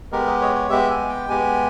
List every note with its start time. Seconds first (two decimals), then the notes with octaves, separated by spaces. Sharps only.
0.12 G#3 B3 G4 A#4
0.27 D#5
0.41 C#5
0.55 C#5
0.70 G#3 B3 G4 E5
0.90 G#5
1.09 G5
1.29 G#3 B3 G4 G#5